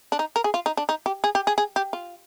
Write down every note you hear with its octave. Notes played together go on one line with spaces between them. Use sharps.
D4
D#4
A#4
G#4
F4
D#4
D4
D#4
G4
G#4
G4
G#4
G#4
G4
F4